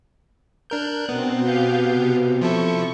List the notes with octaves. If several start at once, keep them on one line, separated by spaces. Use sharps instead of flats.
D4 A#4 F#6 G6
B2 B3 C4
B2 G4 F5 G6
C3
F3 E4 A4 C#6